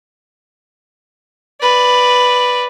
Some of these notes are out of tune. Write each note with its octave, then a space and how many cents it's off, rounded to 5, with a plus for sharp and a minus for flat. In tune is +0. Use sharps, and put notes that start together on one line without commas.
B4 +0 D5 +5